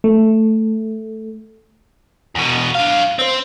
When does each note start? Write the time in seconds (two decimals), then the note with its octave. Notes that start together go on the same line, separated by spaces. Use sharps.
0.04 A3
2.35 E2 B2
2.75 D4 F5
3.19 C4 C5